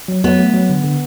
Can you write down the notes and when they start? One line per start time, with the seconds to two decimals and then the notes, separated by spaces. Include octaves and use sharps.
0.08 F#3
0.24 F#3 B3
0.38 A3
0.54 F#3
0.69 D3
0.84 D3